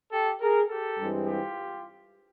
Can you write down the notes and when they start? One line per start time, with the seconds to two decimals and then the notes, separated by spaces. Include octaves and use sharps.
0.12 G4 A4
0.41 G#4 A#4
0.70 G4 A4
0.99 G2 E3 G#3 C4
1.27 F4 G4